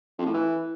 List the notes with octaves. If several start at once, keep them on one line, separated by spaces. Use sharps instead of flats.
F2
A2
E3